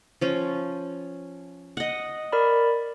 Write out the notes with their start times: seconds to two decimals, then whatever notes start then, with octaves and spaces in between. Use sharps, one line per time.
0.21 F3 C#4
1.77 D#5 F#5
2.32 A#4 D5 B5